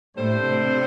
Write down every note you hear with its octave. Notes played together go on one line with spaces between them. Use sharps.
A2 G3 A3 D4 A4 C5
C3 C4